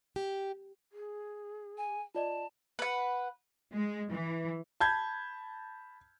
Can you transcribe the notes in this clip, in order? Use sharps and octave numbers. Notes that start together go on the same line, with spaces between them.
G4
G#4
G#5
F4 D5 D#5 A5
B4 F#5
G#3
E3
A5 B5 G6 G#6